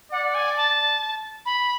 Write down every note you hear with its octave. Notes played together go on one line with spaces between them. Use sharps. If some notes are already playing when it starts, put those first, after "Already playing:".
D5 F#5
F#5
G#5
A5
B5